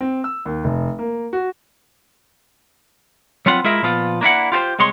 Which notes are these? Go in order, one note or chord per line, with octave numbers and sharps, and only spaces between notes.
C4
E6
D#2
F1
A#3
F#4
F#3 B3 C4 F4 F#5
G#3 E4 F4 G#4 A#4 E5
A#2 F3 B3 F4
A#3 D4 E4 F#5
F4 G4 A4 C5
C2 C3 G#3 C#5 C6